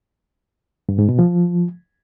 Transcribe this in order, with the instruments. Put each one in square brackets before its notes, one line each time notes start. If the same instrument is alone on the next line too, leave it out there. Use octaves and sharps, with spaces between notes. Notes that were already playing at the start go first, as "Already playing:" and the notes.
[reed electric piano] G2
G#2
B2
F3